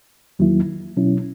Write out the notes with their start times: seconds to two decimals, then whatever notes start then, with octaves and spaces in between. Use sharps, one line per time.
0.39 E2 D#3 F#3 A#3 E4
0.97 B2 F#3 C#4 E4